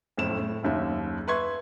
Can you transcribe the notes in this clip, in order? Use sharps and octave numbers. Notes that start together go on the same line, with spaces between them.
F#1 F2 A2 E7
A2
F#1 D#2 E5
B4 E5 C6 C#6 G#6